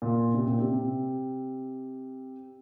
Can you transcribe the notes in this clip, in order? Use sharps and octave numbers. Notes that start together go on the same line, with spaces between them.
A#2
C3
A#2
C3